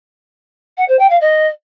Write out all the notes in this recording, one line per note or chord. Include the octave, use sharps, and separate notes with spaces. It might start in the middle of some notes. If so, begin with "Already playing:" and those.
F#5
C5
G5
F5
D#5